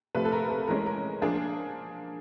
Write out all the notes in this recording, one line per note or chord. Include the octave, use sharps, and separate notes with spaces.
C3 F3 A3 B4
A4
A#4
A4
E3 G#3 C#4 A#4
A#4
F3 A#3 D4 G#4